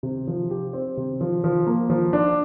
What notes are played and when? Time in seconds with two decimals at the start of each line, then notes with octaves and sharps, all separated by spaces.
0.03 C3
0.27 F3
0.51 G4
0.73 C4
0.97 C3
1.21 F3
1.44 F3
1.67 A#3
1.90 F3
2.13 D4